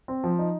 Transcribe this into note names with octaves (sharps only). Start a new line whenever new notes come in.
C4
F3
D#4